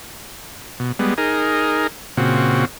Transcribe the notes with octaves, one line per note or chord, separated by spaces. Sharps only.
B2
G3 G#3 B3
D#4 G#4 A#4
A#2 C#3 C4 F#4